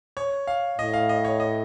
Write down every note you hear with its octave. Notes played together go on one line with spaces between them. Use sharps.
C#5
F5
A2 D#5
F5
D#5
C#5
D#5